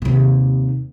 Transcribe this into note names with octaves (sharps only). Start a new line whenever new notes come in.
D#2 C3